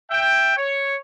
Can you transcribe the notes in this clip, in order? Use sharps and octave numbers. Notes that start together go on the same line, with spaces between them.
E5 G5
C#5